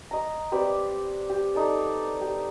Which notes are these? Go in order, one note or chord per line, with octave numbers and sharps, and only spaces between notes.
D#5 A#5
C4 G4 B4 D5
G4
D#4 A4 D5
G4